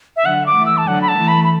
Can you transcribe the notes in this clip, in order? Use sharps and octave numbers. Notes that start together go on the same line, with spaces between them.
E5
D3 F#3 F#5
D6
E3 A3
E6
A5
D3 F#3 F#5
B5
A5
E3 A3
B5
B5